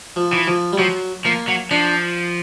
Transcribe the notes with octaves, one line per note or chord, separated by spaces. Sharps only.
F3
E3
F3
G3
F3 F#3
F3 A#3
F#3
F3 D4